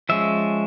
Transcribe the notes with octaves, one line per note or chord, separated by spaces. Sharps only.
F3 G#3 C#4 E5